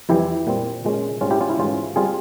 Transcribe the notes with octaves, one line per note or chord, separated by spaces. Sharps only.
F2 E3 G3 E4 G4
A#2 G3 C4
A#2 G#3 C#4
G#2 G3 C4 C#4 F4
E4 G4
C#4 F4
E4
G#2 E3 G3 C#4 F4
G3 C4 F4 G#4